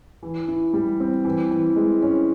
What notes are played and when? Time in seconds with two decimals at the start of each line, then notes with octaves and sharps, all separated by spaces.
0.23 E3
0.48 E4
0.73 G3
1.00 C4
1.25 E3
1.51 E3
1.76 G#3
2.02 C#4